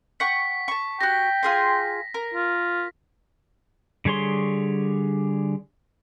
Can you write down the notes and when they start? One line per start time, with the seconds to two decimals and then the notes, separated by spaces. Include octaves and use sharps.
0.20 F#5 G5 C#6 B6
0.68 A5 C#6
1.01 F#4 G4 G5 A#6
1.43 F4 G#4 C6
2.14 A#4
2.34 F4
4.05 D3 G3 G#4 C#5 C6